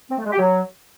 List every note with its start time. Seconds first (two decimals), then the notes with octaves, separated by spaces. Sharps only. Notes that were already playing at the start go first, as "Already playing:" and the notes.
0.10 C4
0.17 A3
0.24 G#3
0.31 G4
0.38 F#3